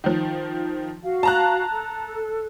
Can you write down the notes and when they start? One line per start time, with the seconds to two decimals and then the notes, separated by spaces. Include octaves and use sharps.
0.04 D#3 F3
1.03 F#4 F5
1.23 A5 A#5 F#6
1.70 A4